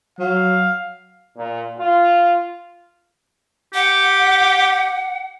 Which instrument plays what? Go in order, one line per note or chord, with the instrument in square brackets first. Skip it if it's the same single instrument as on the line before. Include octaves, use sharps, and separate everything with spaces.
[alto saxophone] F#3 [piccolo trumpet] F5
[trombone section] A#2
F4
[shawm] G4 [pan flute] F#5